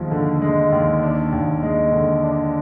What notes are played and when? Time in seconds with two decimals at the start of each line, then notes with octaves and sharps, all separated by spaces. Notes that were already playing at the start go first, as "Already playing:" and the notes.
Already playing: D#2 F3 G#3
0.11 D3
0.42 G#3
0.72 D#2
1.03 D4
1.32 D#2
1.63 G#3
1.92 D3
2.23 D4